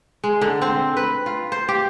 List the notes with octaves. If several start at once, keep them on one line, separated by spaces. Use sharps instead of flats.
G#3
D3
C4
B4
F4
C5
G4